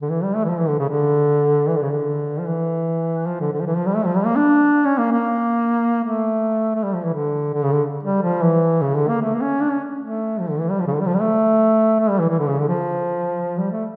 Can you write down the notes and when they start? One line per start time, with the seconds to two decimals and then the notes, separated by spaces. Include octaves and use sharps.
0.02 D3
0.10 E3
0.23 G3
0.36 A3
0.44 E3
0.49 F3
0.59 E3
0.69 D3
0.79 C#3
0.89 D3
1.69 E3
1.76 D3
1.83 C#3
1.91 D3
2.40 F3
2.48 E3
3.27 F3
3.41 D3
3.53 D3
3.61 F3
3.66 E3
3.77 F3
3.86 G3
3.96 A3
4.06 F3
4.16 G3
4.26 A#3
4.36 D4
4.85 C#4
4.98 A#3
5.12 A#3
6.04 A3
6.75 A3
6.83 G3
6.94 F3
7.04 E3
7.13 D3
7.54 D3
7.63 C#3
7.72 D3
8.03 G3
8.23 F3
8.42 E3
8.82 C#3
8.95 D3
9.09 A#3
9.22 A3
9.34 A#3
9.41 C#4
9.61 D4
9.72 C#4
10.01 A3
10.40 F3
10.50 D3
10.60 E3
10.70 G3
10.80 F3
10.87 C#3
10.93 D3
11.01 G3
11.06 F3
11.15 G3
11.20 A3
12.00 A3
12.10 G3
12.19 E3
12.29 E3
12.39 D3
12.48 C#3
12.59 D3
12.69 F3
13.58 G3
13.71 A3